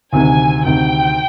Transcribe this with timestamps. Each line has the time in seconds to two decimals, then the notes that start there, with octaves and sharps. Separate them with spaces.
0.13 D2 C3 D#3 G#5
0.65 D2 C3 D#3 G5